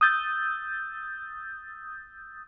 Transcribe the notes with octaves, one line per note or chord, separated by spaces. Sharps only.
D#6 E6 G6 A6